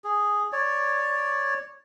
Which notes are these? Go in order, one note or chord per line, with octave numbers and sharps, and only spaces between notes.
G#4
C#5 D5